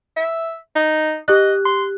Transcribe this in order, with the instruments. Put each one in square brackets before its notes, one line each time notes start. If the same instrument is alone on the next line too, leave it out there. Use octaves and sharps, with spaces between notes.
[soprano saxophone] E5
D#4
[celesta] G4 F#6 [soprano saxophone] D#5
[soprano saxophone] C6